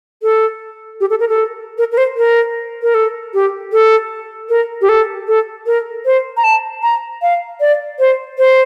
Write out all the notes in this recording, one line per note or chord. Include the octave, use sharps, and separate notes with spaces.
A4
G4
A4
A#4
A4
A#4
A#4
C5
A#4
A#4
A4
G4
A4
A#4
G4
A4
A4
A#4
C5
A#5
A5
A#5
F5
D5
C5
C5